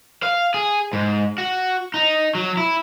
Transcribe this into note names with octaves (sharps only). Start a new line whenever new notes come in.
F5
G#4
G#2
F#4
D#4
F#3
E4